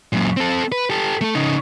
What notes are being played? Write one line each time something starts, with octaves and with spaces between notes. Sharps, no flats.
F#2 A#2
C4 A4
B4
G4 A4
A3 A4
C#3 D#4